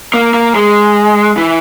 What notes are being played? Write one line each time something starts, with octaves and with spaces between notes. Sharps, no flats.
A#3
A#3
G#3
E3